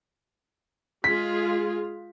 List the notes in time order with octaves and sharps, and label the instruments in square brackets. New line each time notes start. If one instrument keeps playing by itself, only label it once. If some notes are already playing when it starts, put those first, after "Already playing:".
[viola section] G#3 F4 G#4 [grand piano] B6